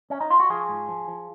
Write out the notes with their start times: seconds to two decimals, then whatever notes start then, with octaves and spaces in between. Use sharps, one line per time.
0.10 C#4
0.20 D#4
0.30 F4
0.40 F#4
0.50 F3 F4 G#4
0.69 G#2
0.88 F3
1.08 F3